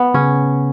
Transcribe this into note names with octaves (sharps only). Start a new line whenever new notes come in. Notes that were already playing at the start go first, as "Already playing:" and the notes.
Already playing: B3
C#3 C#4